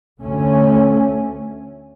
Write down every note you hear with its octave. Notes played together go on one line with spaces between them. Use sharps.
D2 D3 A3 C#4